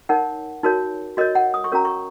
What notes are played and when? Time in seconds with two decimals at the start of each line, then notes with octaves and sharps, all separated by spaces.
0.09 D#4 A#4 C#5 F#5
0.63 D#4 F#4 A#4 C#5
1.17 F#4 A#4 C#5 D#5
1.35 F#5
1.54 D#6
1.64 C#6
1.72 C#4 F#4 A#4 C#5 A#5
1.85 C#6